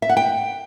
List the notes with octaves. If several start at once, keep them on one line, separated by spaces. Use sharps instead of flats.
E5
F#5
G5